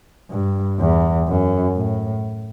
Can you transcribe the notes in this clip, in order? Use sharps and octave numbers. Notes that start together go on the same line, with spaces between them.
G2
E2
F#2
A2